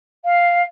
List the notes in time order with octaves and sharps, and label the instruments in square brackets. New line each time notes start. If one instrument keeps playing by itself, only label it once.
[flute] F5